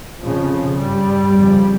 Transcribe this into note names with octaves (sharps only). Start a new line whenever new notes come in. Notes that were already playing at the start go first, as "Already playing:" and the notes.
F2 C#3 F3
G2 G3
F2 C#3